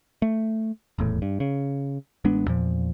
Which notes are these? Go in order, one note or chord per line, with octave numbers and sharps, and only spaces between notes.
A3
D#1 E2 A2
G2
C#3
A1 G#3 B3 D4
E2 A#2 F3